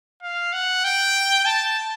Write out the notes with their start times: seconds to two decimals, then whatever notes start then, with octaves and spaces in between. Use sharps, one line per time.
0.23 F5
0.53 F#5
0.84 G5
1.46 A5